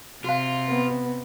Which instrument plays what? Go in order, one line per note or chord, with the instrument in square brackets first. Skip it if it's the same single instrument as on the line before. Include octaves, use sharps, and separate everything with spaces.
[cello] C3 [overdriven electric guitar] F4 [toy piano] F#4 F5
[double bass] B3